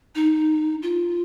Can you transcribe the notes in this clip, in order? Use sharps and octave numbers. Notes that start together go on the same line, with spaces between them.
D#4
F4